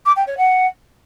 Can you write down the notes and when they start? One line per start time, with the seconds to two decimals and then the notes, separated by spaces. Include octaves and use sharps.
0.06 D6
0.16 G5
0.27 C#5
0.38 F#5